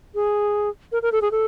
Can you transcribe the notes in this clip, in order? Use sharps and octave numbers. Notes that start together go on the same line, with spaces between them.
G#4
A#4
A#4
A4
G#4
A4